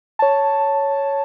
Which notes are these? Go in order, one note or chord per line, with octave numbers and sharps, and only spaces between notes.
C#5 A5